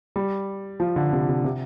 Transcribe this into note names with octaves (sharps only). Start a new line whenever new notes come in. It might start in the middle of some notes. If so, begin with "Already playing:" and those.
G3
F3
D3
C3
C3
C3